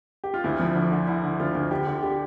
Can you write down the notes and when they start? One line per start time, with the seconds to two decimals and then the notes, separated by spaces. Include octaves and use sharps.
0.24 G4
0.34 F4
0.44 D2 E4
0.59 F3
0.75 D3
0.92 D3
1.07 D3 E4
1.24 D3
1.40 D2 F4
1.55 D2
1.71 D3 G4
1.87 D3
2.03 G4